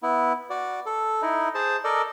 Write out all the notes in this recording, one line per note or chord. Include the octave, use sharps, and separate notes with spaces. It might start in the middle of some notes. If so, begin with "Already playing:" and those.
B3 E4
F#4 D5
A4
D#4 E4
G#4 C5 A5
A4 A#4 D5 D#5